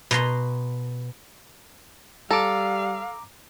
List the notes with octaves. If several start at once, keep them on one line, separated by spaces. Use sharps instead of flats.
B2 A#5 C6
G3 A4 F5 A#5 D6